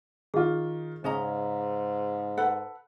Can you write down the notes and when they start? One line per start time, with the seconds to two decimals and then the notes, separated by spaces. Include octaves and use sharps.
0.34 D#3 F4 G#4
1.04 G#2 C#3 C#4 D#5 A#5
2.37 A4 B4 F#5